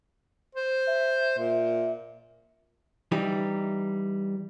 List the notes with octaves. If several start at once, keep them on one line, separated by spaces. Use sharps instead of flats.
C5
E5
A#2
E3 G3 D#4